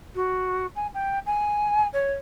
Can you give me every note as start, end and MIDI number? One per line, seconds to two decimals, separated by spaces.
0.15 0.66 66
0.76 0.87 80
0.94 1.19 79
1.26 1.87 80
1.93 2.14 73